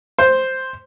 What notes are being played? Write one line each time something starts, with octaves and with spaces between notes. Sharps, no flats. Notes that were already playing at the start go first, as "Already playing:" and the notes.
C5